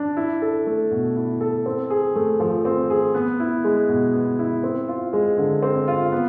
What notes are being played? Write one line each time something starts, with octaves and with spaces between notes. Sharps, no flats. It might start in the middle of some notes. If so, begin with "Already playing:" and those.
Already playing: D4
E4
A4
A3
B2
E4
A4
C4
G#4
A3
F3
C4
G#4
B3
E4
G#3
B2
B3
E4
C4
F4
G#3
D3
C4
F4
B3